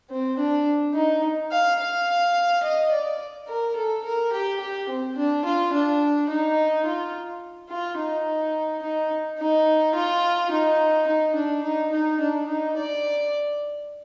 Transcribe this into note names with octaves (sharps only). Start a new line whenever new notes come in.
C4
D4
D#4
F5
F5
D#5
D5
A#4
A4
A#4
G4
G4
C4
D4
F4
D4
D#4
F4
F4
D#4
D#4
D#4
F4
D#4
D#4
D4
D#4
D#4
D4
D#4
D5